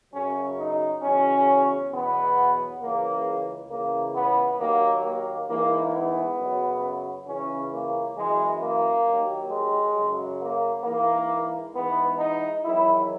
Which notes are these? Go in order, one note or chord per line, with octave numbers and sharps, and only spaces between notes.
F#2 C#3 F#3 C#4
D#4
E2 C#3 F#3 C#4
E2 B2 F#3 B3
C#2 C#3 E3 A#3
C#2 C#3 E3 A#3
B3
D#2 D#3 F#3 A#3
A#3
G#2 E3 A#3
B3
F#2 C#3 F#3
C#2 C#3 E3 C#4
A#3
F#2 E3 G#3
A#3
D#2 D#3 F#3
G#3
F#2 C#3 F#3
A#3
G#2 E3 A#3
G#2 E3 B3
D#4
E2 D#3 F#3 E4